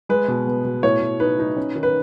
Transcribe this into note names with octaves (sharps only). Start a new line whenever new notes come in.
G#3 B4
B2
B3
B2
A2 C#5
A2
D#4 B4
D#4
C#4
D#3
B4